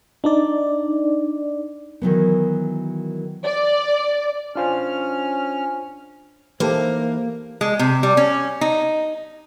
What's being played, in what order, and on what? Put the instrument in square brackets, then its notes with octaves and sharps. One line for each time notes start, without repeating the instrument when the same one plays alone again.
[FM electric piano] D4 D#4 D5
[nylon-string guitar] D#3 E3 F#3 B3
[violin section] D5
[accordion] C#4 F6 [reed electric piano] D4 F4 C5
[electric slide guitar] E3 D#4 E5 [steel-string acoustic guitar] A#3 [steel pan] G4 A4 B4 [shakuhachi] C5
[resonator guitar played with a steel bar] G#3
C3
G3
C#4
D#4